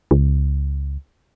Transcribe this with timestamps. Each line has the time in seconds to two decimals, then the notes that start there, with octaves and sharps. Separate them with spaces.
0.11 C#2